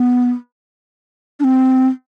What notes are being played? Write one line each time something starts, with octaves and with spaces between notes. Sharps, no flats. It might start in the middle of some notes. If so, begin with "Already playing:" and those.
Already playing: B3
D4
C4